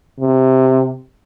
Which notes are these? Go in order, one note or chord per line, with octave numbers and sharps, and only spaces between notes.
C3